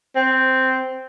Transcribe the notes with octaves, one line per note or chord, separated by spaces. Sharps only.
C4